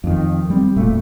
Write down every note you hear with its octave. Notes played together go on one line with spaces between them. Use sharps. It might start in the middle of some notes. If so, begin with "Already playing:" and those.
F2 D#3
G3 C4
E1 A#2 A3